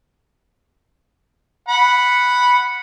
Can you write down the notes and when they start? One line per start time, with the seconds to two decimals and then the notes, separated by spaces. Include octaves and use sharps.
1.69 F#5 B5